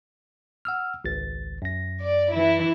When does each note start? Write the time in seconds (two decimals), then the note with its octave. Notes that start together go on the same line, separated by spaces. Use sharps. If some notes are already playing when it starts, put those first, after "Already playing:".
0.65 F#5 E6 F6
1.04 G#1 C#2 A6
1.62 F#2 A#6
2.03 D5
2.34 E3 E4